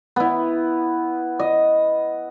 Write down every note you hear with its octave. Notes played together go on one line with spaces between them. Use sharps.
B3 E4
D#5